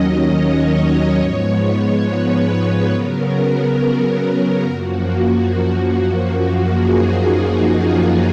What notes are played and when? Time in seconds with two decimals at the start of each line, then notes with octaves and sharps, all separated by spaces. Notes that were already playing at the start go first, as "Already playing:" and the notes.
Already playing: D#2 D#3 F#3 C#4 D#5
0.33 C#5
1.18 G#2 F3 G#3 B3
2.04 B4
2.90 C#3 F#3 B3 A#4
4.63 F#2 F3 A#3 F#4
5.49 F#4
5.92 F#4
6.34 F#2 F3 A#3 F#4
6.64 G#4
6.92 D#4
7.20 D#4
7.63 F4